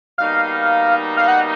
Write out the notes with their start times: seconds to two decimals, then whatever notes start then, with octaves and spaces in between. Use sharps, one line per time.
0.18 B2 G3 A#3 D#4 F5
1.17 F5
1.28 F#5